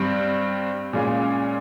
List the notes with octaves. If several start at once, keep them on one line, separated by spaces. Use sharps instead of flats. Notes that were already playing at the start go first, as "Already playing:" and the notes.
Already playing: G2 G3 C4
A#2 G#3 C#4 F4